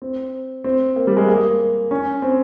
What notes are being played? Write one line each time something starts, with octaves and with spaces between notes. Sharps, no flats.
C4
C4
A#3
G3
G#3
A#3
C#4
C4